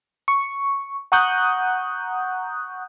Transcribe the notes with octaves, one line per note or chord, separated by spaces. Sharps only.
C#6
F#5 A#5 C#6 D#6 F#6 G6